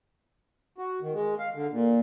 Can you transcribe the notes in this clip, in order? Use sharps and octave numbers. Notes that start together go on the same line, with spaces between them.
F#4
D#3
G#3
F5
D3
A#2